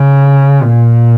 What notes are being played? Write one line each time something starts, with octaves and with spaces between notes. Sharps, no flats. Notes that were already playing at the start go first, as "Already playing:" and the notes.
Already playing: C#3
A#2